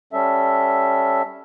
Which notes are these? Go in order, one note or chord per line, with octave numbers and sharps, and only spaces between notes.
G3 C#4 A4 E5